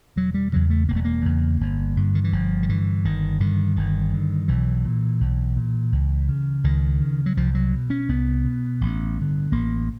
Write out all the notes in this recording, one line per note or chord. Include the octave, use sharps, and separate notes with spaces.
E1 F#3
G3
E2 C#3 F#3
A3
E1 A#3
A3
A#3
E2 C#3
G1
G2 D3
D#3
E3
G1 F3
D#3
G2 D3 E3
G1 D#3
G2 D3 D#3
G1 D#3
G2 D3
B1 E3
A#2
B1
A#2
C#2
C#3
C#2 D#3
C#3
F#3
C2 F3
F#3
B2
C#4
C2 B3
B2
A1
G2 D3
A1 A#3